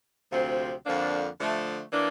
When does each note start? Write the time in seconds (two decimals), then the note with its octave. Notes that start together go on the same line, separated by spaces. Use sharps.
0.31 D2 C3 F3 C4
0.85 F2 D3 F3 A#3 D4
1.39 D3 F3 A3
1.92 E3 A#3 D4